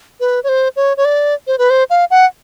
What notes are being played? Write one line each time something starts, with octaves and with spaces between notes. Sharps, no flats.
B4
C#5
C5
C#5
C#5
D5
C5
B4
C5
F5
F#5